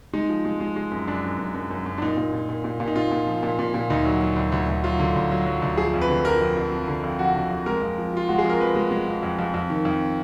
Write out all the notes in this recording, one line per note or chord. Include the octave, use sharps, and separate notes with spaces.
G#3 D#4
F3
G#3
G#3
G#3
F#2
F#2 D4
F#2
F#2
F#2
F#2
F#2
D4
A#2 D#4
A#2
A#2
A#2
A#2
A#2
D#4
A#2 F4
A#2
F3
A#2
A#2
A#2
D2 D#4
F#3
F#3
D2
D2
D2
F#3 F4
D3
D2
F#3
F#3
D2
F3 G#4
F2
B4
D3
F3 A#4
F2
F2
F3
D3
F2
F3 F#4
D3
F2
G#3 A#4
F2
F3
F3 F4
G#3 F#4
G#4
F2
A#4
F3 B4
G#3
G#3
F2
F2
F2
F2
D#3
F2